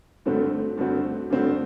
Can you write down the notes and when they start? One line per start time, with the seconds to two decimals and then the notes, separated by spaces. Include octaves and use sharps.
0.26 G2 D3 A3 C4 F#4
0.78 G2 D3 A3 C4 F#4
1.30 G2 D3 A3 C4 F#4